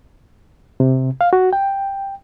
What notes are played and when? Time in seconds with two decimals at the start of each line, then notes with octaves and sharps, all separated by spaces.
0.80 C3
1.21 F5
1.33 F#4
1.53 G5